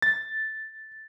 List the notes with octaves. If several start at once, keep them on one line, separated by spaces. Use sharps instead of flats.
A6